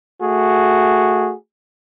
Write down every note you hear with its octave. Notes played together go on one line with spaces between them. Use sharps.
A3 F#4 G#4